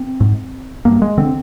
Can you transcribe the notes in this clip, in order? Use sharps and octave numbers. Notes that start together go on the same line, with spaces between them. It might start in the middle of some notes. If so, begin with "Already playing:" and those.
Already playing: C4
G#2
G2 A#3
G#3
D3 C4